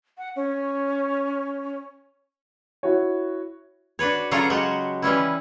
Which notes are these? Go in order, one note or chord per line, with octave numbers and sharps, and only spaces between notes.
F#5
C#4
E4 F#4 C#5
D4 F#4 B4 C#5
C#3 F#3 F4 A4 C#5 A#5
F#3 G#3 F#4 G4
E3 G3 C#4 E4